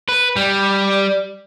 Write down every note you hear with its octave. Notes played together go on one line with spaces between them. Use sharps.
B4
G3